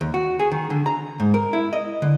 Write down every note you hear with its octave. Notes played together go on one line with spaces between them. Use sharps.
D#2
F#4
G#4
D#3
D3
A#5
G#2
A#4
E4
D#5
D3